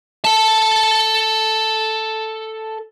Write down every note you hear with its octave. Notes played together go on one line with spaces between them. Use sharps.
A4 A5